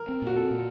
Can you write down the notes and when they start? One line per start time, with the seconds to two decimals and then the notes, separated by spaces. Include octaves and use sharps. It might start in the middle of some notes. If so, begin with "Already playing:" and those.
Already playing: A#4
0.09 C4
0.22 A#2 F#4
0.36 C4 A4
0.51 A#2